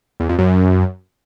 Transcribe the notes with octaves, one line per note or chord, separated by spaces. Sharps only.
E2
F2
F#2